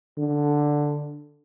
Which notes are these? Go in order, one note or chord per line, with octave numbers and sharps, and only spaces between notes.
D3